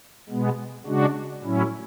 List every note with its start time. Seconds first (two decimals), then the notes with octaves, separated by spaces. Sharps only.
0.29 B2 G#3 B3
0.86 C#3 G#3 D4 F#4
1.43 A2 F#3 C#4 E4